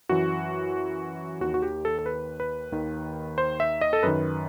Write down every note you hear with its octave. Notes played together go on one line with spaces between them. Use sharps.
F#2 E3 F#4
D#2 D#3 F#4
F#4
G4
A4
A4
B4
B4
D#2 D#3
C5
E5
D#5
A4
F#2 D#3 B4